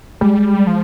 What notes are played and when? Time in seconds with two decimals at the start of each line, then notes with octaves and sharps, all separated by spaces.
0.21 G3 G#3
0.67 F3